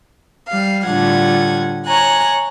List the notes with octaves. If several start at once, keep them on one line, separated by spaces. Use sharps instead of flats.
G3 F5
A2 D3 G3 F4 F#5 G#6
C#5 G#5 A#5 F#6